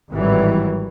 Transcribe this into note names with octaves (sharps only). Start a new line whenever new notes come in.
G#1 A2 E3 F#3 G3